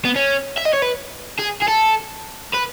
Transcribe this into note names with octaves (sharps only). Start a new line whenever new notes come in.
B3
C#4
E5
D#5
C#5
B4
G#4
G#4
A4
B4